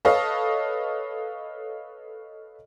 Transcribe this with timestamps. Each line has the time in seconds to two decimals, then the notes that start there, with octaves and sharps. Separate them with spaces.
0.05 A4 B4 C#5 D#5 F5